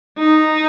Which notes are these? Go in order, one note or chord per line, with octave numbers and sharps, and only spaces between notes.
D#4